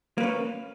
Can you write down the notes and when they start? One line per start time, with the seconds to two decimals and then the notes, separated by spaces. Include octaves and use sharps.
0.18 A#3
0.20 B4
0.23 C#4